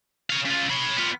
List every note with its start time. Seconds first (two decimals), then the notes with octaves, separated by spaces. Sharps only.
0.30 C#5 F5
0.45 C#3 F4
0.70 C#5 B5
0.96 B3 F4